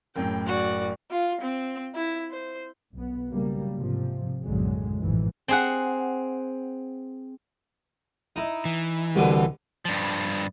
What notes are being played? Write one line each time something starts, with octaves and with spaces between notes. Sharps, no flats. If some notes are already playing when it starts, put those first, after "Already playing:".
F#1 F#2 A2 G5
F#4 D5
F4
C4
E4
C5
B1 B3
C#3 F#3 G3 A#3
G#2 C3 F3
F#1 B1 A2 D3 F#3 G#3
A1 F2 G#2 E3
C4 G#4 F#5
D#4 E4
E3
C2 B2 D3
G2 F3